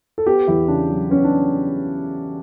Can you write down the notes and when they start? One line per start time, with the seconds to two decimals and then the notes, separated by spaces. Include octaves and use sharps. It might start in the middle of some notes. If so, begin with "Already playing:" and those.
0.18 A4
0.26 B3 G4
0.48 E2 E4
0.68 C#3 D4
0.90 F#3
1.10 B3 C#4
1.24 D4